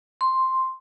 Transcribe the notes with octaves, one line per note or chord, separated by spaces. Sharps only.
C6